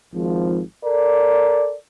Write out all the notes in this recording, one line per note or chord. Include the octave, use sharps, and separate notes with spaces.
G#1 F3
A4 A#4 D5